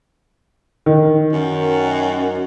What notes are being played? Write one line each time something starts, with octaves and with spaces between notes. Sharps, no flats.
D#3
F#2